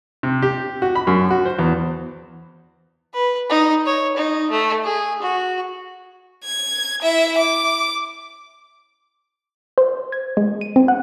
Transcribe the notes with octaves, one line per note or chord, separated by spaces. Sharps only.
C3
G4
F#4
B5
F#2
F#4
C5
E2
B4
D#4
C#5
D#4
A3
G#4
F#4
G#6
E4 E5
D6
C5
G#6
G#3
D#7
C4
F#5